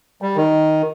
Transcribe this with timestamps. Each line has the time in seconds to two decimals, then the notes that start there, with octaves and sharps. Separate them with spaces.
0.22 G3
0.36 D#3